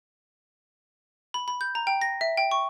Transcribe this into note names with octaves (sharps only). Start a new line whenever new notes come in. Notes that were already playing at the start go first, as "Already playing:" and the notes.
B5
B5
G6
A#5
G5
A#6
E5
G5
C#6